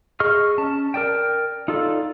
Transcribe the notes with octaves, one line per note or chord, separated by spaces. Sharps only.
G#4 D#5 C#6 F6
C#4 A5
A#4 D5 G5
D#4 F4 A4 D5